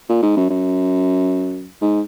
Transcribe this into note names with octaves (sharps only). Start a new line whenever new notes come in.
A#2
G#2
F#2
F#2
G#2